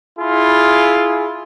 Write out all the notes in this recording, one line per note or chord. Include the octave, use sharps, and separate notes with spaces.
E4 F4 G#4